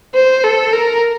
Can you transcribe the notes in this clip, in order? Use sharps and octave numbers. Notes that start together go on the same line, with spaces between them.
C5
A4
A#4